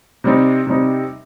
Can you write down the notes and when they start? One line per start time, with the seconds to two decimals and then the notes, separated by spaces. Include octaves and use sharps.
0.24 C3 G3 C4 D#4
0.67 C3 G3 C4 D#4